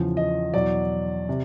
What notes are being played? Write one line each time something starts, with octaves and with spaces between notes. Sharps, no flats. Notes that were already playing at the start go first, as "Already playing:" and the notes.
Already playing: E2 C#3 F3
D#5
E2 B2 F#3 D5
C3